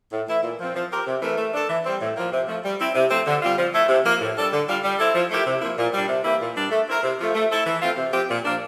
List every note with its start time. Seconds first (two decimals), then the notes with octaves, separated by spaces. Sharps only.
0.12 A2
0.28 E3 A3 E4
0.43 A#2
0.60 F3 C4
0.75 F3
0.91 C4 G4 A#4
1.06 C3
1.22 E3 A3 E4 A#4
1.37 A3
1.53 D4 A4
1.69 E3
1.85 G3 C4
2.01 A2
2.16 F3 A#3
2.32 C3
2.47 F3 A3
2.64 G3
2.80 C4 E4
2.94 C3
3.10 F3 A3 C4
3.27 D3
3.42 G3 C4 F4
3.57 F3
3.73 A3 E4 A4
3.88 C3
4.04 F3 A#3
4.21 A2
4.36 G3 D4 A4
4.52 D3
4.67 G3 D4 F4
4.83 G3
4.99 C4 E4 A4
5.15 F3
5.30 A3 E4 G4 A#4
5.46 C3
5.61 F3 A#3 E4
5.78 A#2
5.93 G3 D4
6.08 C3
6.24 E3 A#3 E4 G4
6.41 A#2
6.55 G3 D4
6.71 A3
6.87 C4 E4 A#4
7.03 C3
7.19 F3 A3
7.34 A3
7.50 C4 E4 A4
7.65 E3
7.81 A3 C4 F4
7.97 C3
8.13 F3 C4 G4
8.29 A#2
8.44 F3 A#3 D4